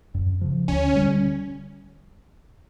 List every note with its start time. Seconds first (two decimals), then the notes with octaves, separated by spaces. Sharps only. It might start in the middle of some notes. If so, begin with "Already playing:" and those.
0.14 F#2
0.41 C#3 F3
0.68 D2 C#4
0.96 D3 G3